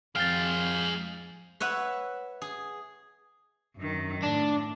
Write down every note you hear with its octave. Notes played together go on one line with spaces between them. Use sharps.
F2 G#3 F5 G5 F6 A6
B4 C#5 E5 F#5
G#4
F#2 D#3
A2 D4